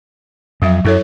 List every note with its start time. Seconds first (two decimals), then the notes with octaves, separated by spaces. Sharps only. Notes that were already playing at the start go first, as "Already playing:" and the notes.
0.62 F2 F#3 E5
0.85 F#2 E4 A4 C#5